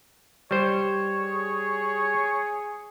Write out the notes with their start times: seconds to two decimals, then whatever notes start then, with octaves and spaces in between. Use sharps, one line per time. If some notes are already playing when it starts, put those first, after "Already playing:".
0.51 G3 C5 C#5
1.19 G#4